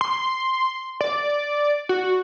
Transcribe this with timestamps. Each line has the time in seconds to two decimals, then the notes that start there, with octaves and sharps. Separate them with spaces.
0.01 C6
1.01 D5
1.89 F#4